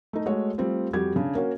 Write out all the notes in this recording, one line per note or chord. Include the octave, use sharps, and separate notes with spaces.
A3 D#4
G#3 A3 F#4 C#5
G3 A3 C4 F4
F2 G3 F#4 G4 G#6
C#3 D4
A#3 C#4 F#4